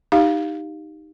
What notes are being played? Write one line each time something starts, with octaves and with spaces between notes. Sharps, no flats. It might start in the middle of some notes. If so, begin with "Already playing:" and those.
D#4 G4 F5